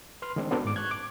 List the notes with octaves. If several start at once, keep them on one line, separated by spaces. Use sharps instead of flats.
B4 C6 F6
D#3 G#3 C4 D4
B3 C4 D4 F#4 A4 A#4
G#2 D6
C#6 F#6 G#6
D6